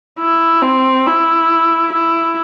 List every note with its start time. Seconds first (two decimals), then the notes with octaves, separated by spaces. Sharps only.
0.19 E4
0.62 C4
1.07 E4
1.93 E4